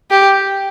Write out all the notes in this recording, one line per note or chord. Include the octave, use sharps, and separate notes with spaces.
G4